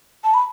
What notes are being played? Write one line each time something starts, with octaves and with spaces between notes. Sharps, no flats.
A5
B5